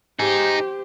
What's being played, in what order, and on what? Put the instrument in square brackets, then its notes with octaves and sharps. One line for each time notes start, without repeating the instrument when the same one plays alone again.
[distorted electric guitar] D#4 G#4 [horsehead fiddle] G4 C5